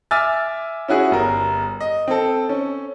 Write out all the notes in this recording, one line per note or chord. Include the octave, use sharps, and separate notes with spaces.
E5 G#5 D6 E6 F6 A6
C#4 E4 F#4 G#4
G1 A#4
D#5
C4 A4
C#4